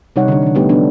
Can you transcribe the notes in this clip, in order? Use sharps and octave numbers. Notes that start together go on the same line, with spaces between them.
C3 G3 D#4 C#5 F#5
D3 G3 D4
D3 E3
G3 A3 B3 D#4 G4
F3 B3 D4